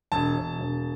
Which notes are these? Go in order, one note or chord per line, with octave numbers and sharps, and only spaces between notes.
E1 A5
E1
E1